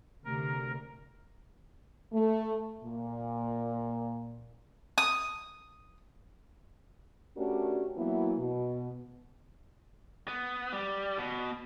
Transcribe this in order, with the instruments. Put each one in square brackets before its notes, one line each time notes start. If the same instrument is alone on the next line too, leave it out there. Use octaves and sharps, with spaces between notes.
[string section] D2 C3 [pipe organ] A#4
[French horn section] A3
A#2
[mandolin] D#6
[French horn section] A3 C#4 D4 F#4 G4 A#4
E3 F#3 A#3 B3 E4
B2
[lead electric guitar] B3
G3
B2